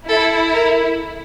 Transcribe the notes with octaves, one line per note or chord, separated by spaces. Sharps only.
E4 A4
A#4